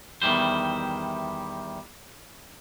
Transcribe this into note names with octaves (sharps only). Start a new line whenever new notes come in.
E2 D#3 E3 G3 C5